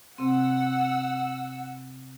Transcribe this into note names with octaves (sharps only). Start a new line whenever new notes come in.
C3 C4 F#5 E6